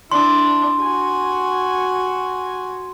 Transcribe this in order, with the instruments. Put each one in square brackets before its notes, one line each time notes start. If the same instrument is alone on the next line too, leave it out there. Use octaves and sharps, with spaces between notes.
[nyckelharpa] D4 E4 [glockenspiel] C6
[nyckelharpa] F#4 G#5